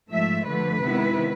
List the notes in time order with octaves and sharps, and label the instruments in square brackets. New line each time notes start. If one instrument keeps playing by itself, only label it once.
[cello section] G#2 F3 A3 E5
D3 F3 A3 B4
C3 D#3 G#3 B3 E4